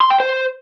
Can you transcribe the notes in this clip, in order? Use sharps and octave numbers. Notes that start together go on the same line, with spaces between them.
C6
G5
C5